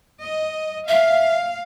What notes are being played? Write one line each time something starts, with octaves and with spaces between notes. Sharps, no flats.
D#5
E5 F5